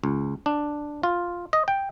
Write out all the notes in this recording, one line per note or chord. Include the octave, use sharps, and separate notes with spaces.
C#2
D4
F4
D#5
G5